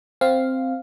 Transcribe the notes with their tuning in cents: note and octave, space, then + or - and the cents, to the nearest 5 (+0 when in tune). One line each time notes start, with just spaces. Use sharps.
C4 +0 F5 +0